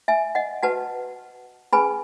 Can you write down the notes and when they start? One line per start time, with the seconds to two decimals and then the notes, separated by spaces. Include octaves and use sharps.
0.08 E5 G#5
0.35 D#5 F#5
0.63 F#4 B4 F#5 A5
1.73 C#4 G#4 B4 G#5 B5